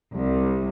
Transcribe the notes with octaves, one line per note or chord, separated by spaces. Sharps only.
C2